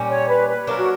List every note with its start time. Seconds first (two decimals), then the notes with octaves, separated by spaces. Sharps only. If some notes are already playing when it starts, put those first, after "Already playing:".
Already playing: A#2 G3 C#4
0.09 C#5
0.28 B4
0.48 B4
0.67 F#3 A#3 D4 A#4
0.79 F#4